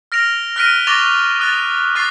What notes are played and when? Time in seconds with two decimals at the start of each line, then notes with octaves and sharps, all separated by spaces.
0.12 F6 A#6 D7 F7
0.56 F6 F#6 A#6 B6 D7 D#7
0.87 C#6 D6 A6 A#6 F7 G7
1.39 D#6 F#6 A6
1.95 C#6 F#6 A6 C7